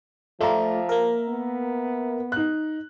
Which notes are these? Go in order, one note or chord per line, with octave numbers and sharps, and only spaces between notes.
F3 A3 F4 D5 E5 A#5
A#3 A#4
B3
D#4 F#6